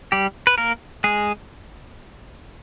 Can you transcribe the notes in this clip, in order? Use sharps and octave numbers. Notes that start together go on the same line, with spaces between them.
G3 G4
B4
A#3 A#4
G#3 G#4